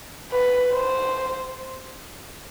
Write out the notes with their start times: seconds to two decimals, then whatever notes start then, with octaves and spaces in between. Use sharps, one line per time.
0.32 B4
0.74 C5